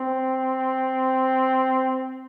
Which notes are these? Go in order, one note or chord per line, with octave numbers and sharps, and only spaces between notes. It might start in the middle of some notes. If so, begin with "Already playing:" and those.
Already playing: C4